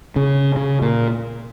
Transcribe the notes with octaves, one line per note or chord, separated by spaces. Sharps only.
C#3
C#3
A#2